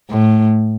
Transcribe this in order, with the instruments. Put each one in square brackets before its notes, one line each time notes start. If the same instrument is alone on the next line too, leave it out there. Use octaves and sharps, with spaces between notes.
[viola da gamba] A2